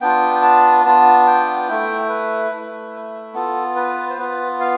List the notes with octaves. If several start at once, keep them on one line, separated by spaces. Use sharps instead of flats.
B3 D4 F4 G5
A5
B3 D4 F4 A5
G5
A3 E4 G5
B4
A3 E4
B3 F4 A4
B4
C5
B3 F4 B4
F5